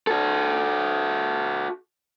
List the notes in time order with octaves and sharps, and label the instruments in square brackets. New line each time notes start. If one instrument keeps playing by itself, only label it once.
[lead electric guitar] F#4 A4